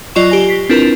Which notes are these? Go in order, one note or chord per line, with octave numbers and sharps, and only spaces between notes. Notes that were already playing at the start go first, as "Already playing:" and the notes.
F#3 F4 D5 D#5 C#6 E7
G4 G#5 A#6
B6 C7
C4 D4 E4 F4 A#4 B4